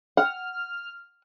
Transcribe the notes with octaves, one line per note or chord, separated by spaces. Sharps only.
F#5 F6